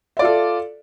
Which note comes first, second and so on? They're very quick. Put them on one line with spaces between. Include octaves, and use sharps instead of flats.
E5 D5 F4 A4